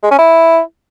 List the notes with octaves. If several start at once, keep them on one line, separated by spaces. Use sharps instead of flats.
G#3
C#4
E4